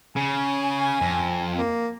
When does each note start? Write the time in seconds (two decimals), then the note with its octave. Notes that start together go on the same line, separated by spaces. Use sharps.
0.16 C#3 G#5
1.01 F2
1.57 A#3